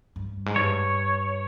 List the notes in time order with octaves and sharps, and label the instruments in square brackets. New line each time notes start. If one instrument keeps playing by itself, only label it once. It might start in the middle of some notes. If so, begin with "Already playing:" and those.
[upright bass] G2
G#2
[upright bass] G2 [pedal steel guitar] C#5